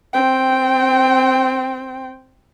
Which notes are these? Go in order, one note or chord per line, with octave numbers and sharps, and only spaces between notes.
C4 G5